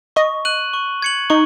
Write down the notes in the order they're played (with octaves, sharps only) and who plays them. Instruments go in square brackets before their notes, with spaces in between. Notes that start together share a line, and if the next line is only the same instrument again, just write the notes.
[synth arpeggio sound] D#5 [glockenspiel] C#6
[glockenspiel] F#6 D#7 F#7
C#6
G#6 C#7 F#7
[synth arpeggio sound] D#4 [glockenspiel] C#6